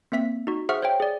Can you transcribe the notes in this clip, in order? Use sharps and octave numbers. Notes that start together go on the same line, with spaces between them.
A#3 C4 E5 B6
D#4 F#4
G#4 C5 E5 F#5 C#6 F6
C5 C#5 E5 G5
G#4 D5